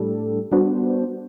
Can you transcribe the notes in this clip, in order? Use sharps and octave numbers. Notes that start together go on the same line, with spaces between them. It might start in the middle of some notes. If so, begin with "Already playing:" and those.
Already playing: A2 G3 D4 A4
G3 B3 D4 F#4 C5